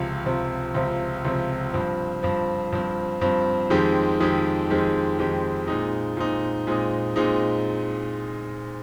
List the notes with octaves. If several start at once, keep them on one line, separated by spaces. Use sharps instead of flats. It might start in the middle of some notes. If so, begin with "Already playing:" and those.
Already playing: C#2 C3 F3 C4
C#2 C3 F3 C4
C#2 C3 F3 C4
C#2 C3 F3 C4
G2 F3 C4
G2 F3 C4
G2 F3 C4
G2 F3 C4
F2 D#3 G#3 C4 G4
F2 D#3 G#3 C4 G4
F2 D#3 G#3 C4 G4
F2 D#3 G#3 C4 G4
A#2 G#3 C4 D#4
A#2 G#3 C4 D#4
A#2 G#3 C4 D#4
A#2 G#3 C4 D#4